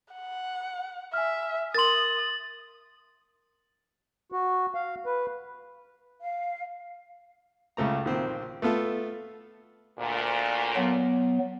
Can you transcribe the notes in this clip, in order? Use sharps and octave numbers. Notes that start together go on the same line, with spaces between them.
F#5
E5 G#5 F6
A#4 C6 D#6 A6 F#7
F#4
F5
B4
F5
C#2 C#3 A3 A#5
A#1 D#3 C4
A3 B3 F4 A4
D2 A#2
F#3 B3